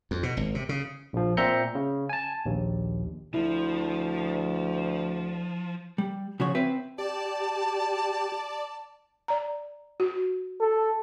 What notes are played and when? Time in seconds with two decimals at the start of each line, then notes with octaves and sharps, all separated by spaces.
0.11 F2
0.23 B2
0.37 G#1
0.55 C3
0.69 C#3
1.13 A#1 F3
1.37 A#2 C4 E5 A#5 G6 C#7
1.75 C#3
2.09 G#5 A5
2.45 A#1 D#2
3.34 D2 F3 E4
5.98 G3
6.40 C#3 F3 F#4 C#5
6.55 C4 B4 E5
6.98 G4 D5 A5
9.28 D5 A#5
10.00 F#4
10.60 A4